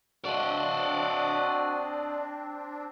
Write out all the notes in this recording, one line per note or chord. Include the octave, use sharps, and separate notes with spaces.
C4 D4 F#4 D5 D#5